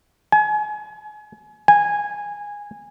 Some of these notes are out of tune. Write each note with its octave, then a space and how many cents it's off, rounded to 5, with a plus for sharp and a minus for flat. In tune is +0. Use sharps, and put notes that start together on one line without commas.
G#5 +35
G#5 -10